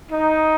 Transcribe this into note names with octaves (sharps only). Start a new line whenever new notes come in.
D#4